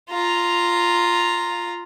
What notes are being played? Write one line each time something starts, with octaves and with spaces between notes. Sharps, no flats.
F4 A#5